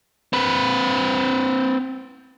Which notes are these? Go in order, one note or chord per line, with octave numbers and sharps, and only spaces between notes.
C4 B4